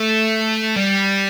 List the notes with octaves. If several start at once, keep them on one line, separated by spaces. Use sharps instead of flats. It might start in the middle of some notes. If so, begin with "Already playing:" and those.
Already playing: A3
G3